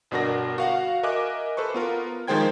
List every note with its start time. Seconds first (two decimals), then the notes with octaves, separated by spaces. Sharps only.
0.11 G1 B2 D4 F#4 A#4 A#6
0.58 F#4 F5 F#5
1.03 A#4 D#5 E5 G#5 D6 F#6
1.57 A4 B4 C5 C#6
1.74 B3 F4 A#4
2.28 D#3 F3 G#3 C5 G5 G#6